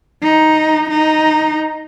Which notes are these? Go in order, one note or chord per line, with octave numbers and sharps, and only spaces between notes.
D#4
D#4